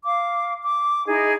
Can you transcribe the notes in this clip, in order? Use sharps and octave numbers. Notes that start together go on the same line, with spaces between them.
F5 D6
D6
D#4 E4 G#4 D#5